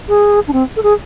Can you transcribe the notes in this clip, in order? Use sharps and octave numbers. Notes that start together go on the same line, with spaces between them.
G#4
D4
C4
A4
G#4